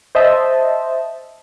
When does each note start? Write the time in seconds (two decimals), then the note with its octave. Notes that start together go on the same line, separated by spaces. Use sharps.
0.15 C5 D#5 E5 A5